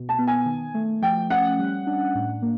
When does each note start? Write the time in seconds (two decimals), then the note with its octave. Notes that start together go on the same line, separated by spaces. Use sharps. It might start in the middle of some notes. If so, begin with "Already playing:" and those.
Already playing: B2
0.09 A5
0.19 B3
0.27 G#5
0.46 D#3
0.74 A3
1.02 F3 G5
1.30 C#4 F#5
1.59 G3
1.87 D4
2.15 A2
2.42 A#3